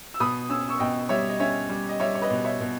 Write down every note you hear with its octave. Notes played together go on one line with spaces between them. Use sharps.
E6
B2 B5 D#6
C#4 E6
C#6 E6
B2 D#5 G5
G3 C#5 E5
D#5
C#4 C#5 E5
G3
D#5
G3 C#5 E5
C#5
B4 D#5
B2
C#5 E5
B2